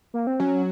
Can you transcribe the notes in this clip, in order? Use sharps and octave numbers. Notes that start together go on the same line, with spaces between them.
A#3
C4
F#3 C#4